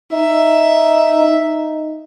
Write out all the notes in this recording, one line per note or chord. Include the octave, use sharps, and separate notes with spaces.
D#4 E5
D#4